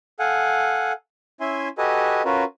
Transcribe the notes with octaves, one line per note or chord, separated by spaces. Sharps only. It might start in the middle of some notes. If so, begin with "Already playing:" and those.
A4 F5 F#5 G#5
C#4 E4 E5 G#5 C6
F#4 G4 A4 B4 D#5 G#5
C#4 F4 F#4 A#4 B4